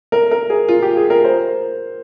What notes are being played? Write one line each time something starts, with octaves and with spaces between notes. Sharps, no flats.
A#4
A#4
G#4
F4
G4
G#4
A#4
C5